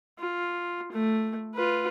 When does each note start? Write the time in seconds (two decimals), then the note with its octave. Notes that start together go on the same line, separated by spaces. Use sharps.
0.19 F4
0.92 A3
1.55 F4 B4